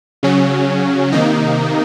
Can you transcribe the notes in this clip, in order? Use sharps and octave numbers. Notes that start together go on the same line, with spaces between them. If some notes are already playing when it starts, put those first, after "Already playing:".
C#3 F#3 C#4
C3 D#3 A#3 D#4